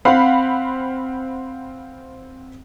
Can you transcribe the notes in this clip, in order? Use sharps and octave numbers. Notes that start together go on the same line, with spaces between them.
C4 F5 F#5 B5